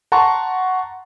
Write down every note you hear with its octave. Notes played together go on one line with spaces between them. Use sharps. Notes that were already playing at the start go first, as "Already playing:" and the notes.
F#5 A5 A#5 C6 C#6